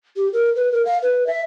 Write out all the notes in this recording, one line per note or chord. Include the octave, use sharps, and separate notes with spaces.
G4
A#4
B4
A#4
F5
B4
E5